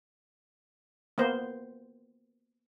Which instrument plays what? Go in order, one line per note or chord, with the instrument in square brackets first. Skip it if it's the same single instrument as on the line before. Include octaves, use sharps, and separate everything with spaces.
[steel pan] A#3 B3 C5